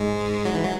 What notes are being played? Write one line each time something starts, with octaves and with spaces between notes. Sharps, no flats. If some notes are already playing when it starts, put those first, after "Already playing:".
Already playing: G#2 G#3
F#3
E3
F#3